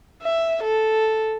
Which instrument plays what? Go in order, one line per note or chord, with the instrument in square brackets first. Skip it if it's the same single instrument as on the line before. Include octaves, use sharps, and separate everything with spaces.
[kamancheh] E5
A4